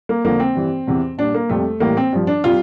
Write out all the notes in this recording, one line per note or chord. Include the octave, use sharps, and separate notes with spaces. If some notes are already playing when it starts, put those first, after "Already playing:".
A#3
F2 D3 F3 A#3
C4
G2 E3 G3
E2 C3 E3
A#2 G3 D4
A#3
F2 C3 G3 A3
A2 E3 G3 A#3
C4
G2 F3
D4
C3 G3 F4